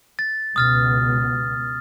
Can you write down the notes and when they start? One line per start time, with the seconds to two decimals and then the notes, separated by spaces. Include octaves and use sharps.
0.19 A6
0.56 C#2 B2 D#6 F6 A6